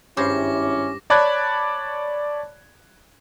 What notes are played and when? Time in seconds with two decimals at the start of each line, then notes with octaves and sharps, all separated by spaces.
0.17 G#1 G2 C#4 E4 C5 D6 A#6
1.10 C#5 D5 A5 B5 F#6 G#6